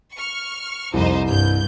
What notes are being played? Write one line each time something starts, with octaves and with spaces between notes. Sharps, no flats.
C#6 F6
C2 F2 D#4 C5
G2 G6